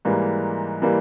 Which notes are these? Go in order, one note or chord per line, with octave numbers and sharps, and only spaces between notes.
G#2 E3 G3 A#3
E3 G3 A#3